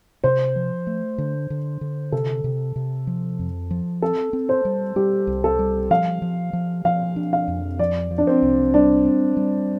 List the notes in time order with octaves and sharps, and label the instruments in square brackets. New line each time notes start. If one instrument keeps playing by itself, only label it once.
[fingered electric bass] C3 [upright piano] C5
[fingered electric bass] F3
A3
D3
D3
D3
[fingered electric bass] C3 [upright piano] A4
[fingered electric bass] C3
C3
F3
F2
F3
[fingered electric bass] C4 [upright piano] A4
[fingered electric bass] C4
[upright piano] C5
[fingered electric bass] G3
[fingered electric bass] G3 [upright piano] G4
[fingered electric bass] C2
[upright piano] A4
[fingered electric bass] G3
[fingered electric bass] F3 [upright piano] F5
[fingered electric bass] F3
F3
[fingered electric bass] F3 [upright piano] F5
[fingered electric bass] D4
[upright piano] F5
[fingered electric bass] F2
[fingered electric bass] F3 [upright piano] D5
[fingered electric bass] F3
[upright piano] D4
C4
[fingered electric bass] C2
[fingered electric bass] G3 [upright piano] D4
[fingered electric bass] C4
G3